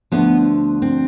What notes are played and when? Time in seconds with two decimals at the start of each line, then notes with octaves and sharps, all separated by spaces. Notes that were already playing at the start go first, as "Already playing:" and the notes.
0.12 D2 D3 F3 B3
0.82 C4